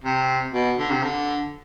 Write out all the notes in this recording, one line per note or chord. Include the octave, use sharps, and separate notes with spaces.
C3
B2
D3
C3
D3